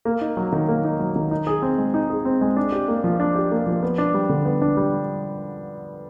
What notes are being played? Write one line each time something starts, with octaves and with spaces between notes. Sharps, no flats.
A#3
D#4
F#3
D#3
A#3
D#4
F#3
D#3
D#4
G#4
C4
G#3
D#4
G#4
C4
G#3
D4
G4
A#3
F3
D4
G4
A#3
F3
B3
D4
G3
D3
B3
D4
G3